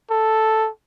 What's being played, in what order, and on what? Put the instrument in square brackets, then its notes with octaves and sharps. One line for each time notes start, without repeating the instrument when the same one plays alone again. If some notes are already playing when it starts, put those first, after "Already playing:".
[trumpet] A4